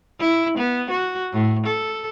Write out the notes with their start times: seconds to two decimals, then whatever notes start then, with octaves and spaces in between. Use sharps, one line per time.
0.20 E4
0.58 B3
0.91 F#4
1.33 A2
1.67 A4